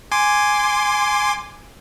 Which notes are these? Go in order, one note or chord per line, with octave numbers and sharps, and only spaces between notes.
G#5 C6 D6